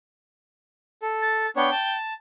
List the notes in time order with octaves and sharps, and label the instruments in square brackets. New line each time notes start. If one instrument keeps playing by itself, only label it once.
[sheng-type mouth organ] A4
[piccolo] A6
[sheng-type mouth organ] B3 D4 C#5 [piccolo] G5
[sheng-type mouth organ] A5